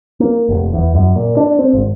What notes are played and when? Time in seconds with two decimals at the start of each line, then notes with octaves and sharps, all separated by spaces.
0.20 A#3
0.49 F1
0.73 E2
0.95 F#2
1.15 A#2
1.37 D4
1.59 C4
1.73 G#1